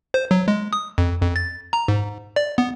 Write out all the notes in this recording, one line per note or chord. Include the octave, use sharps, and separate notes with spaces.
C5
F#3
G#3
D#6
F2
F2
A6
A#5
G#2
D5
B3